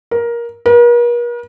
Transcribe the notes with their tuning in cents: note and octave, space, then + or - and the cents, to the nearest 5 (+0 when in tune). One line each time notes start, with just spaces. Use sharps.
A#4 +15
A#4 +45